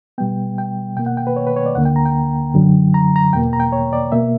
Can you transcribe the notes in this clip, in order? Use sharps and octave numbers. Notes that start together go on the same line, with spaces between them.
B2 G3 B3 G5
G5
B2 A#3 G5
F#5
G5
B4
C#5
B4
C#5
D5
D2 D3 A#3 F#5
G5
A#5
G5
F#2 D3 F#3
A#5
A#5
E2 B2 A#3 G5
A#5
G5
C#5
D5
B2 A#3 E5